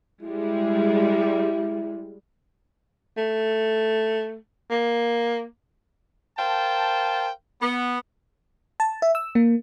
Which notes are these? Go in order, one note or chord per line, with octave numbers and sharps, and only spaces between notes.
G3 G#3 E4
A3
A#3
A#4 C5 F5 G5 A5
B3
A5
E5
E6
A#3